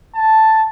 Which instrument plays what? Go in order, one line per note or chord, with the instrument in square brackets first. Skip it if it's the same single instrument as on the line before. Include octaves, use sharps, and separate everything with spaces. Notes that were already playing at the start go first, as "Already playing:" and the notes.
[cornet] A5